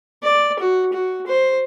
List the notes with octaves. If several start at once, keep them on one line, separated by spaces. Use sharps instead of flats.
D5
F#4
F#4
C5